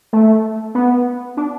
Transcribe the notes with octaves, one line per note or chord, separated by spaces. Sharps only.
A3
B3
D4